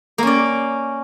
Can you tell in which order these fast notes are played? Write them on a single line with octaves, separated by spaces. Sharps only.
A#3 C#4 D5